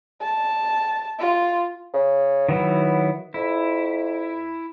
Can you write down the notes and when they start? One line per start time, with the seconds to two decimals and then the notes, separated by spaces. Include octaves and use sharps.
0.22 A5
1.19 F4
1.94 C#3
2.49 D#3 F#3 B3 E4
3.34 F2 E4